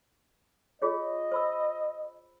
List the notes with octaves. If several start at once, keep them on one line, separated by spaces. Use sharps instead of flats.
F4 G#4 C#5 D#5
C5 B5 E6